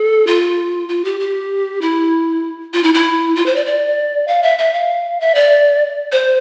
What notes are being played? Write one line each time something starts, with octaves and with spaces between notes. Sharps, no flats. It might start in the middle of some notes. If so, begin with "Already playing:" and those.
Already playing: A4
F4
F4
G4
G4
E4
F4
E4
E4
F4
C5
D5
D5
F5
E5
E5
F5
E5
D5
C5